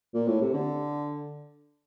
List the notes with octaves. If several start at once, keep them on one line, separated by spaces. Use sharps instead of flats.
A#2
A2
C3
D3